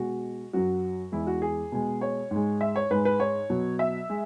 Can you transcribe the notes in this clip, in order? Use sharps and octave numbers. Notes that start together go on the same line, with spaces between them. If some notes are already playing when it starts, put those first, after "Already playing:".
Already playing: B2 G#3 F#4
F#2 F#3 F#4
E2 E3 G#3 E4
F#4
G#4
B2 G#3
C#5
G#2
G#3
E5
C#5
G#2 G#3 B4
B4
C#5
B2 F#3
E5
G#3